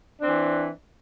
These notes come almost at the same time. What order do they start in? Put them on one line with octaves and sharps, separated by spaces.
D4 C4 E3